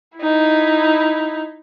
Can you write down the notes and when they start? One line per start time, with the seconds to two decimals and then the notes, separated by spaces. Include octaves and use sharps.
0.18 D#4 E4